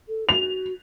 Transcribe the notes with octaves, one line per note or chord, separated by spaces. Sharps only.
A4
F#4 F7